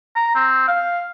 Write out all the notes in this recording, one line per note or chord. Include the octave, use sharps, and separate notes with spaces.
A#5
C4
F5